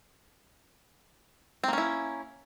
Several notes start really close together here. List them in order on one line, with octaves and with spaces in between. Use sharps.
C4 A#3 C#4 E4